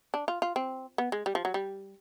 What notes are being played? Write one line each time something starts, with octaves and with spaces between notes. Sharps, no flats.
D4
F4
F4
C4
B3
G#3
G3
F3
F#3
G3